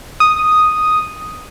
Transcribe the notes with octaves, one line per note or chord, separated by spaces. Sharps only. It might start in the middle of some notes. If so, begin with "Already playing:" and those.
D#6